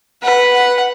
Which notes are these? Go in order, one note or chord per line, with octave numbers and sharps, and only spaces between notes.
B4 F#5
F#5